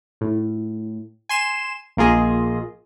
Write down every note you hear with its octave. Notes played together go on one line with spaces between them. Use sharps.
A2
G#5 C6 E7
A#1 A#3 F4 G#4 D#5